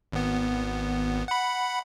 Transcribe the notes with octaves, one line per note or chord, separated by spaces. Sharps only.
G#1 B3
F#5 B5